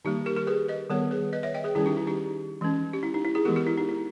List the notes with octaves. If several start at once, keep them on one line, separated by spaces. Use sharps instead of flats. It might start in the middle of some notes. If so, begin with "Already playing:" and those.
D#3 G3 A#3 D#4 G4
G4 A#4
G4 A#4
G#4 B4
B4 D#5
D#3 G3 B3 A#4 C#5
G#4 B4
B4 D#5
C#5 E5
D#5 G5
G#4 B4
D#3 G3 C#4 E4 G#4
D#4 G4
E4
D#4 G4
E3 G#3 C#4
G4
E4
D#4
E4
E4 G#4
E3 G#3 B3 G4 A#4
G4 A#4
E4
D#4
E4